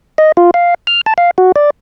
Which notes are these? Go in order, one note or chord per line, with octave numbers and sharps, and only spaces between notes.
D#5
F4
F5
F6
A5
F5
F#4
D5